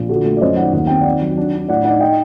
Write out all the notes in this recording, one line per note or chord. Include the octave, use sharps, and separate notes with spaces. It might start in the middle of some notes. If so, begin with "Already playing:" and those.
Already playing: A#1
D3 F#4 A4
A3
D5
F#2 C5 D#5
D#3 D5 F#5
D#2 F#5
C4 G5
D#3 D5 F#5
F#3
D4
D4
A2 D5 F#5
D#4 D5 F#5
D#5 G5